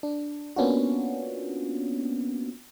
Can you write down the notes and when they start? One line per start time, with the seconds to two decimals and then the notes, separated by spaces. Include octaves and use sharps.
0.03 D4
0.56 A#3 B3 C#4 D4 F4 F#4